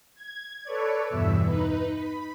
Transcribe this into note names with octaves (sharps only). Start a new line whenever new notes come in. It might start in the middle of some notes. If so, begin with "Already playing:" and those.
G#6
A4 B4 C#5 D5
E2 G2 B2 E5
D#4 B4
B5